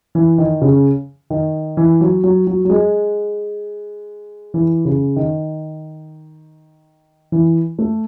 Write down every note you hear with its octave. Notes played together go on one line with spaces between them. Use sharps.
E3
D#3
C#3
D#3
E3
F#3
F#3
F#3
F#3
G#3
E3
C#3
D#3
E3
A3